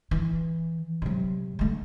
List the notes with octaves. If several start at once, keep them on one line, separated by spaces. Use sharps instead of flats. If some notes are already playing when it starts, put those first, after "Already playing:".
E3
C3 F#3
D3 A3